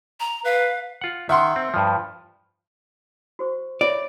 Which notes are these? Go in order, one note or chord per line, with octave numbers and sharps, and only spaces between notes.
A#5
B4 F5
F4 F#5
D#3 E5 F#5 C6
C4
G2 F3
F#4 C5 C#6
F4 C#5 D5 E5